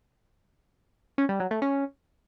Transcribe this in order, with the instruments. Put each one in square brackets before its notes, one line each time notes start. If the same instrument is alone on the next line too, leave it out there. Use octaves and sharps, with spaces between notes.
[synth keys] C#4
G3
F#3
A3
C#4